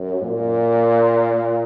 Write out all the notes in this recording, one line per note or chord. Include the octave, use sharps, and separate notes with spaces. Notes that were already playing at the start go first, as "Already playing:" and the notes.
Already playing: F#2
A#2